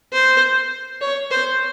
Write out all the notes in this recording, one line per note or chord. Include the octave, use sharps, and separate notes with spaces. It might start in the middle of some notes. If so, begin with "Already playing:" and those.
C5
C#5
C5